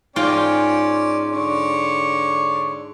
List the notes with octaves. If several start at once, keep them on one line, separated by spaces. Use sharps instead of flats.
G#2 C#4 F4 D5 G5
D3 C#5 D5